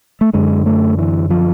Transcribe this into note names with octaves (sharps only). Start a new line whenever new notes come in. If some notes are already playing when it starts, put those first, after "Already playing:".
A3
F#2 D3 G#3
A3
E3
F3